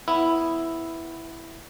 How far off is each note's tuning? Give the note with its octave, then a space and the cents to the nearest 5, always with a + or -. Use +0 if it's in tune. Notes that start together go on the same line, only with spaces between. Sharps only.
B3 +10 E4 +0